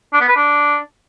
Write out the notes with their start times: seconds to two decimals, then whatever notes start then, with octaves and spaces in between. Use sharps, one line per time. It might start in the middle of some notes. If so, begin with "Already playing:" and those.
0.13 D4
0.21 B3
0.29 B4
0.36 D4